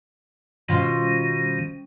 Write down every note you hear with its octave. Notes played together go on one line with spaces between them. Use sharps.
B2 D#3 G3 C#4 F4 C5